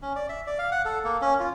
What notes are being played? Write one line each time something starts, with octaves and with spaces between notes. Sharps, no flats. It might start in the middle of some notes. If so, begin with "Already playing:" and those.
C#4
D5
E5
D5
F5
F#5
A4
A#3
C#4
F4